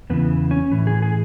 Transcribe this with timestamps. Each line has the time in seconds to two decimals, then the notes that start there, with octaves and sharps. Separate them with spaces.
0.10 E2 C#3 E3 B3
0.51 C#4
0.72 A2 E3
0.87 G#4
1.02 G#4